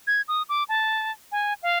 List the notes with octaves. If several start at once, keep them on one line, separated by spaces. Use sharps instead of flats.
G#6
D#6
D6
A5
G#5
F5